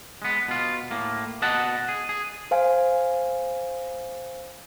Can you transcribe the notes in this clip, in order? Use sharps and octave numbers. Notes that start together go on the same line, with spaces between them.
G#3 B3
B2 F4
A2 A#3
B2 D#5 F#5 A5
G#4
G#4
C5 F5 G#5